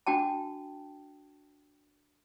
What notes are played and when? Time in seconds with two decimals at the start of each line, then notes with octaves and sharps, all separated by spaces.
0.07 D4 F#4 G5 A5